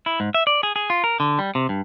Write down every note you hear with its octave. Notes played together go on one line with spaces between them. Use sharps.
E4
G#2
E5
D5
G#4
G#4
F4
A#4
D3
G3
C3
G2